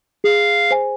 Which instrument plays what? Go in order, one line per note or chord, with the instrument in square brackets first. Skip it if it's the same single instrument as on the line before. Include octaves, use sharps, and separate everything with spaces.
[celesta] G#4 [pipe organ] F5
[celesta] C5 G#5